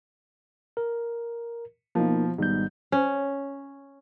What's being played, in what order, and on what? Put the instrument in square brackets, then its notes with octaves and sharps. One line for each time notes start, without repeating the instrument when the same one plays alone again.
[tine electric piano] A#4
[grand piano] B2 F3 [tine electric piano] A#3 D#4
[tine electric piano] G#1 G3 G6 [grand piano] G#2 B2
[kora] C#4